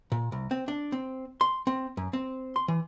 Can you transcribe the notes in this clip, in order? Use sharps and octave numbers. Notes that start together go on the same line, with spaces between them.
A#2
C2
C4
D4
C4
C6
C4
F#2
C4
C6
E3